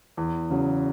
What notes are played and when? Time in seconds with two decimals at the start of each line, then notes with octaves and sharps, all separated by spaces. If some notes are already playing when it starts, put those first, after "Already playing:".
0.17 E2
0.51 C#3 F#3